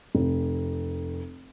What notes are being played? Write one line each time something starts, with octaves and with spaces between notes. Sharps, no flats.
F1